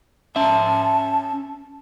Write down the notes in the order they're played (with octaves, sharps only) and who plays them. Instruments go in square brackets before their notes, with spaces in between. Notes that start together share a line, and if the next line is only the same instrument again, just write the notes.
[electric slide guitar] C#4 E5 [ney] A5